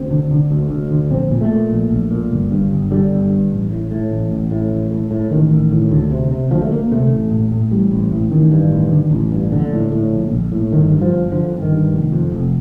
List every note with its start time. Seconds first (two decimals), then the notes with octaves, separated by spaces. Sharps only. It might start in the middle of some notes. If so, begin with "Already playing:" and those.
Already playing: D2 C4
0.11 D3
0.31 D3
0.51 D2
0.71 D2
0.91 D3
1.11 A#1 C4
1.31 A#2
1.41 A3
1.51 A#2
1.71 A#1
1.91 A#1
2.11 A#2
2.31 G1
2.51 G2
2.71 G1
2.91 D3 G3
3.11 G1
3.31 G2
3.51 A1
3.71 A2
3.91 A2
4.11 A1
4.31 A1
4.51 A2
4.71 A1
4.91 A2
5.11 A2
5.31 A1 D#3
5.51 A1
5.72 A2
5.92 D2
6.11 C3
6.32 C3
6.51 D2 F3
6.62 A3
6.71 D2 A#3
6.92 C3 A3
7.11 A1
7.31 A2
7.52 A2
7.71 A1 G3
7.92 A1
8.12 A2
8.32 A1 D#3
8.52 G2
8.71 A1
8.92 D3
9.11 A1
9.31 G2
9.52 A#1 D3
9.72 A2
9.92 A2
10.12 A#1
10.32 A#1
10.52 A2
10.72 G1 D#3
10.92 G2
11.02 F3
11.12 G1
11.32 D3 F3
11.52 G1
11.62 D#3
11.72 G2
11.92 F1
12.12 F2
12.32 F1